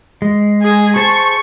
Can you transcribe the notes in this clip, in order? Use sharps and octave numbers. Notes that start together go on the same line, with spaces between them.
G#3
G#4
G#4 C5 A5 C#6